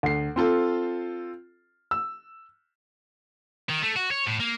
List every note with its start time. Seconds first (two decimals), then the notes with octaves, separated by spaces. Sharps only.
0.03 D2 C7
0.36 C4 F4 A4
1.91 E6
3.70 D#3
3.82 A3
3.96 F#4
4.11 C#5
4.27 A2
4.40 A#3